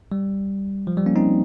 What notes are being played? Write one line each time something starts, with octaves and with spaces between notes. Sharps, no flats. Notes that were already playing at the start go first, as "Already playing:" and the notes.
G3
F3
G3
A#3 C#4
C4 D#4